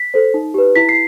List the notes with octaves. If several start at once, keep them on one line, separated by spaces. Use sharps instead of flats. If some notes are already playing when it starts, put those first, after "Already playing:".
Already playing: B6
A4 C5
D#4
G4 B4
E4 B6
C7